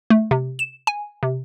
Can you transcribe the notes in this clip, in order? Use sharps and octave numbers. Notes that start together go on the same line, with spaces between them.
A3
C3
E7
G#5
C3